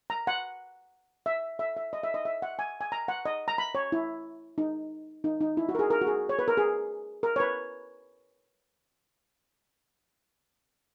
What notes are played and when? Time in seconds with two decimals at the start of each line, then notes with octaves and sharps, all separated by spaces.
0.10 A#5
0.27 F#5
1.26 E5
1.59 E5
1.77 E5
1.93 D#5
2.03 E5
2.14 D#5
2.25 E5
2.42 F#5
2.59 G#5
2.81 G#5
2.92 A#5
3.08 F#5
3.26 D#5
3.48 A#5
3.58 B5
3.75 C#5
3.92 E4
4.58 D#4
5.24 D#4
5.41 D#4
5.57 E4
5.69 F#4
5.75 A#4
5.79 G#4
5.90 A#4
6.01 F#4
6.07 G#4
6.29 C#5
6.39 B4
6.48 A#4
6.57 G#4
7.23 A#4
7.36 C#5
7.40 B4